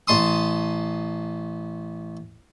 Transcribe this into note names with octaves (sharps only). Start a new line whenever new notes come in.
A1 A5 C6 D#6